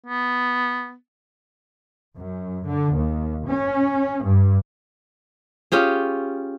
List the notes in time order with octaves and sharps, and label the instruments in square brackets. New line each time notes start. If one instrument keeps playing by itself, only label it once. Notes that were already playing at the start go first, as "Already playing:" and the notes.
[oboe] B3
[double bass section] F#2
D3
D#2
C#4
G2
[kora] C#4 F4 G4 G#4